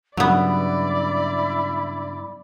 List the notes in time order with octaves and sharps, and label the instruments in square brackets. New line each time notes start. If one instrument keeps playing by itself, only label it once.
[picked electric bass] G2 C#3 [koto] F#3 B3 [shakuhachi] E4 [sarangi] D5